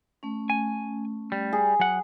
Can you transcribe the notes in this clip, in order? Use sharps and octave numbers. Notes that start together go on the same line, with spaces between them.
A3 C#4
G#5
G3
G#4
F#3 F#5